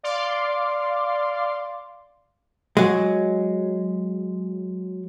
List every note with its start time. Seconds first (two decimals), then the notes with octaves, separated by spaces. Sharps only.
0.03 D5 F5 C6 D6
2.77 F#3 G#3